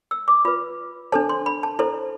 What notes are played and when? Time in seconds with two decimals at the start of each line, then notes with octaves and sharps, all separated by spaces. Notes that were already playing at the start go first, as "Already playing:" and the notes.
0.11 E6
0.28 D6
0.45 F4 B4 B5
1.12 D4 A4 C5 A5
1.29 C6
1.46 B5
1.63 A5
1.79 E4 A4 C5